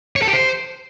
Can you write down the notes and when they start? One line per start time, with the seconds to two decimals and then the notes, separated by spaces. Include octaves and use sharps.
0.16 C#5
0.22 A4
0.28 G4
0.33 C5